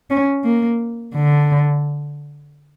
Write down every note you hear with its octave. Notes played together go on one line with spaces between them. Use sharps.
C#4
A#3
D3